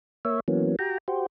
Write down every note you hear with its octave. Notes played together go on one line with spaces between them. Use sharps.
A#3 C#5 E5
E3 F#3 A#3 B3 C#4
F#4 G4 G5 A#5
F#4 G4 C5